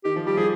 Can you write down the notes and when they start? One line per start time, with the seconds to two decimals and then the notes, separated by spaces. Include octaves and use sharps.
0.05 D#3 G4
0.16 F3
0.27 G3 G4
0.37 F3 G#4